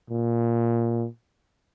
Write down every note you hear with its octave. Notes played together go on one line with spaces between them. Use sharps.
A#2